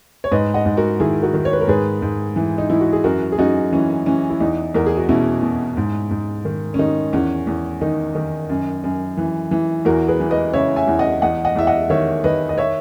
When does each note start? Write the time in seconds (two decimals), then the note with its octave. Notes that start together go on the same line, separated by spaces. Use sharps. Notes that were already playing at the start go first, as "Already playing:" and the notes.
0.24 C#5
0.32 G#2 B4 D#5
0.54 D#5 F#5
0.66 G#2
0.77 F#4 A#4
1.00 D#3 E4 G#4
1.22 F#4 A#4
1.34 D#3
1.45 C#5
1.53 B4
1.61 A#4
1.68 G#2 G#4 B4
2.02 G#2
2.36 E3
2.58 D#4
2.70 E3 E4
2.81 F#4
2.93 G#4
3.04 F#2 F#4 A#4
3.32 G#4
3.38 F#2 D#4 F#4
3.72 E3 C#4
4.06 E3 C#4
4.30 E4
4.40 E2 D#4
4.74 E2 A#4
4.86 G#4
4.97 F#4
5.09 B2 C#4 E4
5.42 B2
5.77 G#2
6.11 G#2
6.45 D#3
6.74 C#4
6.79 D#3 D#4
7.13 E2 C#4
7.47 E2
7.81 D#3 D#4
8.15 D#3
8.50 F#2
8.84 F#2
9.17 E3
9.51 E3
9.85 E2 F#4 A#4
10.08 G#4 B4
10.20 E3
10.31 B4 D#5
10.54 C#3 C#5 E5
10.76 E5 G#5
10.88 E2
10.99 D#5 F#5
11.22 E2 D#5 F#5
11.45 D#5 F#5
11.56 E2 E5
11.67 D#5 F#5
11.90 D#3 C#5 E5
12.24 D#3 B4 D#5
12.49 D#5
12.58 C#5 E5